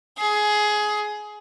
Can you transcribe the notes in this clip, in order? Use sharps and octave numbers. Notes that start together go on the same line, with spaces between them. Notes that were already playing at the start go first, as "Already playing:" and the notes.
G#4